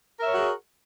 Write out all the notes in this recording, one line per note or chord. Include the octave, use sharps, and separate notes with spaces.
F#4 G#4 A#4 C#5 E5